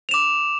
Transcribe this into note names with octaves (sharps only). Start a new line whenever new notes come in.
D6 E7 F7